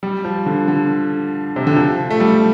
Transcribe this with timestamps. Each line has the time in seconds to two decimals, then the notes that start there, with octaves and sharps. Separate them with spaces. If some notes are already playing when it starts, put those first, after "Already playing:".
0.03 G3
0.25 F3
0.46 D3
0.68 D3
1.56 C3
1.67 D3
1.76 F3
2.10 A3
2.20 G3